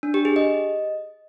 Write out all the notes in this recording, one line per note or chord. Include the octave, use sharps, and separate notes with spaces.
D4
G4
G#4
D#5